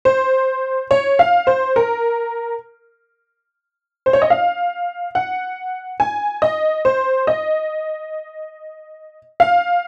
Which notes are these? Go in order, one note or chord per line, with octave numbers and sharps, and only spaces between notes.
C5
C#5
F5
C5
A#4
C5
C#5
D#5
F5
F#5
G#5
D#5
C5
D#5
F5